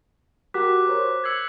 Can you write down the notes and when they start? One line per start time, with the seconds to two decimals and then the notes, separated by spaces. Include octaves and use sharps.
0.54 F#4 G4 A#4 D6 F#6 B6
0.87 A#4 C5 C#5
1.24 E6 G6 G#6 C7 C#7